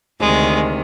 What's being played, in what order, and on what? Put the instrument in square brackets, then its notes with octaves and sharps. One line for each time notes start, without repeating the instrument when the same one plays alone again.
[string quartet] D2 C3 D#3 G#3